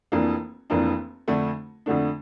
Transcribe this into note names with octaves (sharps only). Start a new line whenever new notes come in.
F1 F2 E3 A#3 D4
F1 F2 E3 A#3 D4
F2 D3 A3 D4
F2 D3 A3 D4